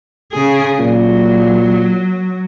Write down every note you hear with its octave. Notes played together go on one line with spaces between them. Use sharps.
C#3 G#4
A#2 F#3